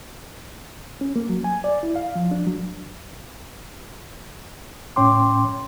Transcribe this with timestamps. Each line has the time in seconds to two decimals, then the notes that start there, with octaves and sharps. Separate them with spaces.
1.01 C#4
1.16 A#3
1.29 F#3
1.44 G#5
1.64 D5
1.83 E4
1.96 F5
2.15 F3
2.31 D4
2.47 F#3
4.96 A2 C#4 C#5 G5 C6 D6